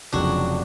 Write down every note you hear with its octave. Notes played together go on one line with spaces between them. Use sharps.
F1 F2 C#3 F#3 D4 F#4